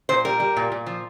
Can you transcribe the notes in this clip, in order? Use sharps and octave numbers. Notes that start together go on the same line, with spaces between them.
A#2 C5
G3 A#4
G3
A#2
A#2
F3